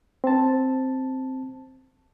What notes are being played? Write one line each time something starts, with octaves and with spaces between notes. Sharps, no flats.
C4 A5